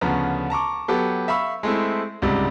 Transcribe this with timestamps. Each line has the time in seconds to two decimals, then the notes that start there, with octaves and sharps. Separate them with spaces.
0.01 D2 C#3 F3 B3 A#5
0.50 A5 A#5 C#6 D6
0.88 F#3 B3 G4 A4
1.28 E5 F5 B5 C#6 E6
1.63 G#3 A3 C4 E4
2.22 C#2 G#2 C3 G3